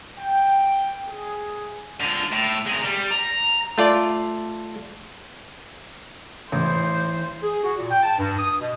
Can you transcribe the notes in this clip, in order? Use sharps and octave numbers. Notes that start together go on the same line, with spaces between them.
G5
G#4
D3 F4
A2
G#3 A#4
G3
A#5
A3 F4 D5
A1 E3 C5
G#4
F#4
A#2
G5
A5
G2
D#6
B2